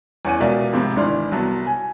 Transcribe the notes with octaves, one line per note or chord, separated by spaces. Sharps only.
E2 C#4 F#5 G#5 D#7
C#2 B2 A#4 D5 E5 F5
G#2 C3 F3 C4 G5 B5
G#1 E3 D4 E4 C6 F6
C2 F#3 B3 A5
G#5